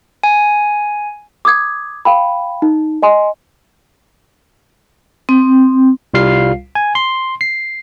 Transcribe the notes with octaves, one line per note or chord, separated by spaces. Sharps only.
G#5
D6 D#6 G#6
F5 G5 B5
D#4
D#5 G#5 C6
C4
C2 G3 F4 F5 C7
G#5
C6
C7